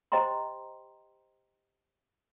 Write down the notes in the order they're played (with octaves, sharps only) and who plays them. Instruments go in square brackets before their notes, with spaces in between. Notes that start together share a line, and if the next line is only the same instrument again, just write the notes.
[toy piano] G4 C5 D#5 G5 A#5 C6